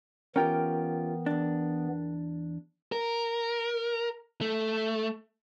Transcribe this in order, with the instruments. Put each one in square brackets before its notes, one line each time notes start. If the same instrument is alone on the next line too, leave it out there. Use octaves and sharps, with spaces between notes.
[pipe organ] E3 B3 [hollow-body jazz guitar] C#4 F4 G4 [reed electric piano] A#4 G5
[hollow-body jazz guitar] E2 D4
[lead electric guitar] A#4
A3